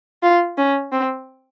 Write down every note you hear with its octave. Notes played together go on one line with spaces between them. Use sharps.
F4
C#4
C4